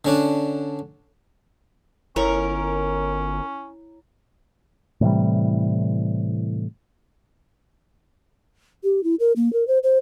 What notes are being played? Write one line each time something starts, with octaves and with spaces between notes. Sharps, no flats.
D3 C#4 D4
G1 C#4 E4 A#4 C#5 A#5
A2 C3 E3 G3
G4
E4
A#4
A#3
A#4
C5
C5